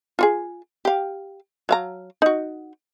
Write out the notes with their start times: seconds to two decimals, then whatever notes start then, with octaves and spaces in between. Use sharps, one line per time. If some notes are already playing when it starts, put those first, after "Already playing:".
0.19 F4 F#4 G#4
0.85 G4 F5
1.69 F#3 F5 A#5
2.22 D#4 F#4